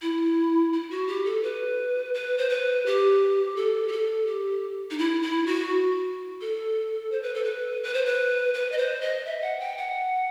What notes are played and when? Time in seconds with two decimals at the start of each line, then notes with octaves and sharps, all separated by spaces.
0.02 E4
0.73 E4
0.91 F#4
1.08 G4
1.25 A4
1.43 B4
2.14 B4
2.38 C5
2.49 B4
2.86 G4
3.56 A4
3.88 G4
3.92 A4
4.27 G4
4.91 D#4
4.98 E4
5.22 E4
5.47 F#4
6.41 A4
7.12 C5
7.23 B4
7.34 A4
7.44 B4
7.83 B4
7.94 C5
8.06 B4
8.54 B4
8.72 D#5
8.78 C5
9.01 D#5
9.25 E5
9.42 F#5
9.60 G5
9.78 F#5